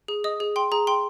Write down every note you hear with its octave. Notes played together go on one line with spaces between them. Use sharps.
G#4
D#5 D#6
G#4
G5 C6
G#4 A#5
G5 C6